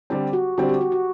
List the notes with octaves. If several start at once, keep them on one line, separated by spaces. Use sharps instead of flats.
D3 G3 C4 G4
F#4
D3 G3 C4 F#4
G4
F#4
F#4